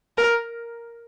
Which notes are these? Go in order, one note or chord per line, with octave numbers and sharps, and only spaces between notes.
A#4